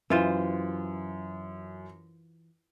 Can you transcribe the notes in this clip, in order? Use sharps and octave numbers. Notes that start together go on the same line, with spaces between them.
F#2 E3 F4 C5